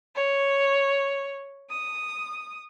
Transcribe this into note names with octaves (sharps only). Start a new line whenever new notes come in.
C#5
D#6